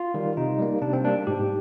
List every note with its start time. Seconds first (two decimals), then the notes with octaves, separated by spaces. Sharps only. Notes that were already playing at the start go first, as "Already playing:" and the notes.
Already playing: F4
0.14 D#3 G3
0.37 C3 D#4
0.59 G3 A#3
0.82 C3 D4
0.93 C4
1.04 G3 A#3 D4
1.27 G#2 G4